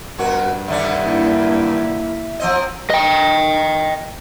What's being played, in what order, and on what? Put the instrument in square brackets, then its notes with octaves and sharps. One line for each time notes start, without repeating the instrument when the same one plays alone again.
[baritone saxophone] G2 [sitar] B2 F#4 [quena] A#4
[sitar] D#2 D3 D4 [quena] E5
[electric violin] A#3 E4
[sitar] F3 C4 D#5
[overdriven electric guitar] D#5 G5